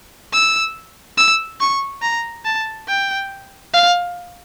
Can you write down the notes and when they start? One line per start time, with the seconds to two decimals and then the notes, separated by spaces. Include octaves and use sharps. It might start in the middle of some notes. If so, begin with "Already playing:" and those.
0.33 E6
1.17 E6
1.60 C#6
2.02 A#5
2.45 A5
2.88 G5
3.73 F5